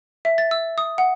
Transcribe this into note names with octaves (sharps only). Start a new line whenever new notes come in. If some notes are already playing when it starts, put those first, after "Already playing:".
E5
A6
E6
D#6
F#5